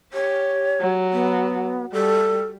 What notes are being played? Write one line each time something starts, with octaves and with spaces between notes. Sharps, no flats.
G4 C#5
F#3
B3
G3 A4